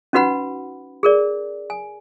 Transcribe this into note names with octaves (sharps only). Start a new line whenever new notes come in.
C#4 D#4 F#4 B4 F#5 B5
G#4 A#4 D5
G#5